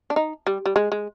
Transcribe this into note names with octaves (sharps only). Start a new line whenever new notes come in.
D4
D#4
G3
G3
G#3
G#3